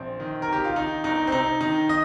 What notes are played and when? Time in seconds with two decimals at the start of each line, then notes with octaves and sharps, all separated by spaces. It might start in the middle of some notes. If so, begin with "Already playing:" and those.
Already playing: A#1 C4
0.20 D#3
0.42 A#4
0.48 D#3 G4
0.64 F4
0.76 D#3 D#4
1.04 G1 D#4
1.27 C4
1.32 C3 D#4
1.61 D#3 D#4
1.89 D#3 D#5